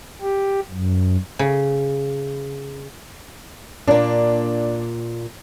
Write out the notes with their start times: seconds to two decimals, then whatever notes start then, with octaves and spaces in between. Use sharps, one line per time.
0.22 G4
0.70 F#2
1.39 C#3
3.88 A#2 A#3 D4